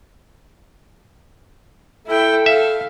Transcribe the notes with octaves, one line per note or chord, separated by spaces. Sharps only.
E4 A4 G5
E5 F5